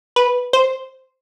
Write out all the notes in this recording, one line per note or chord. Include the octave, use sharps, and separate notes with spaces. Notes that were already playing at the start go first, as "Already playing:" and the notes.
B4
C5